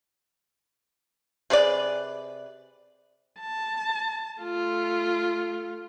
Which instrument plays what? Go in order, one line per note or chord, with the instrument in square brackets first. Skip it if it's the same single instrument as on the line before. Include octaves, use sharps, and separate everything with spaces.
[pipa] C3 G#4 B4 D5
[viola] A5
A3 F4